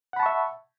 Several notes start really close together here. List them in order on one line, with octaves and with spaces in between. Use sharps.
F#5 B5 A5 C#6 E5